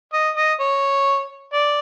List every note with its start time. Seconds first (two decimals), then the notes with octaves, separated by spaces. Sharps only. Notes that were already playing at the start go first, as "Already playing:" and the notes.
0.13 D#5
0.37 D#5
0.60 C#5
1.53 D5